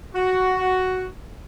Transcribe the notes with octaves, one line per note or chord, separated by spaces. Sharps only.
F#4